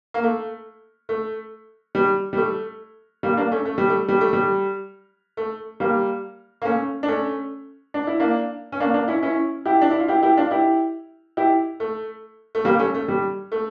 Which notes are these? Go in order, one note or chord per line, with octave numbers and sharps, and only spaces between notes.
A#3
A3
A3
G3
G3
A3
G3 A#3
A#3 D4
A3 C#4
A3
G3
A3
G3
A3
G3
A3
G3 A#3
A#3
A3 C#4
D4
A3 C#4
D4
E4
A#3 D4
C#4
A#3 D4
A#3 D4
C#4 E4
C#4 E4
E4 G4
D4
E4
F4
E4 G4
E4 G4
D4 F4
E4 G4
E4 G4
A3
A3
G3 A#3
A3 C#4
A3
G3
A3